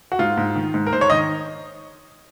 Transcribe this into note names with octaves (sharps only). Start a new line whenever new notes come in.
F#4
G#2 F4
G#2
D#3
G#2
A#4
G#2 C5
C#5
D#3 D#5